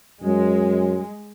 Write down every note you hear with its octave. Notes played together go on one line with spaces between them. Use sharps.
F#2 G#3